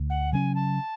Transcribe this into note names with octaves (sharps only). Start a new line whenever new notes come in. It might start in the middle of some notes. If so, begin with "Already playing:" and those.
Already playing: D2
F#5
C#3 F#3 C#4 G#5
A5